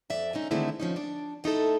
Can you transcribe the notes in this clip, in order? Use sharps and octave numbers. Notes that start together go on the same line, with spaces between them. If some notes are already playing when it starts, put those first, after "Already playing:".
F2 D5 E5
D3 G#3 C#4 D#4
D3 D#3 G#3 A3 C4 E4
F3 C#4 D#4
D4 D5
A3 D#4 E4 A4